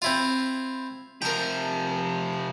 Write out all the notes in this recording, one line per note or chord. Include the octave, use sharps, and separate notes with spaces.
C4 E4 F4
C3 F3 A#4 G5